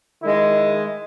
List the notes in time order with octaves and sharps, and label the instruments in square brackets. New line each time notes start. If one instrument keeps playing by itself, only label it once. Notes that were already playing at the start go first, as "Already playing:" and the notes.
[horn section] D#3 G#3 E4